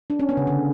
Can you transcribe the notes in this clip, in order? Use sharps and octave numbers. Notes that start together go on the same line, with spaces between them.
D4
C#4
B3
C#3
D3